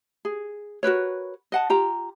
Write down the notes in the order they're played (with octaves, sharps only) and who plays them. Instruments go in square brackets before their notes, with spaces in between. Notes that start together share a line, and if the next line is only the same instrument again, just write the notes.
[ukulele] G#4
F#4 A#4 B4 C#5
D#5 F#5 A5
F4 G4 A#5